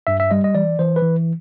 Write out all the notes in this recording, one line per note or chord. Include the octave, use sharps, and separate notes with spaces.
G2 E5
E5
G3 D#5
D#5
E3 D5
E3 C5
B4
E3